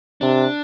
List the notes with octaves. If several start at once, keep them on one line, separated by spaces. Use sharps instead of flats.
C3 D4